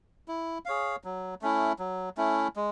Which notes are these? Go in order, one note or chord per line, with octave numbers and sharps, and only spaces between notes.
E4
G#4 C#5 F5
F#3
A3 C#4 E4
F#3
A3 C#4 E4
G#3